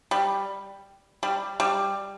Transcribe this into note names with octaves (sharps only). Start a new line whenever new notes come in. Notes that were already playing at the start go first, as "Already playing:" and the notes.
G3
G3
G3